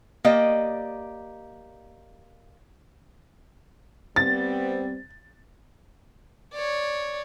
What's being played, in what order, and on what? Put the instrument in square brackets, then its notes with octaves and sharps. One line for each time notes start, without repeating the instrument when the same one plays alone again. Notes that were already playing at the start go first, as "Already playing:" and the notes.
[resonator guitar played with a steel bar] A#3 G4 D5 D#5
[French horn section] G3 B3 C4 [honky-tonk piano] A6
[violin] C#5 D5